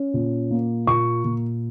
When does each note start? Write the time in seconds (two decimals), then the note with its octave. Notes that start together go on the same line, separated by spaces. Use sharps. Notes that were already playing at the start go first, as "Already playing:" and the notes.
Already playing: C#4
0.14 A#2
0.51 A#3
0.87 A#2 C#6
1.24 A#2